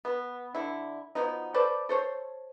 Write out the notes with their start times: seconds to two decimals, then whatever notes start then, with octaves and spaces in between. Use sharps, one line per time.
0.05 B3
0.55 D3 E4
1.15 B2 F3 B3 D#4
1.54 A4 B4 C5 D5
1.89 A4 C5 C#5